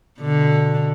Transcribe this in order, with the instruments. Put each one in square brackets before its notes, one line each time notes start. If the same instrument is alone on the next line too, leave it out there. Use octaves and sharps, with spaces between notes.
[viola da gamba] B2 D3